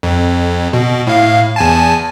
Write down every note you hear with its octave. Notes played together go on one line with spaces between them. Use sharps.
F2
B2
A2 F5
E2 G#5 A5